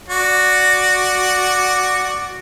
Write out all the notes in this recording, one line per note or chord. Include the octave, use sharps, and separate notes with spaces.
F#4 D5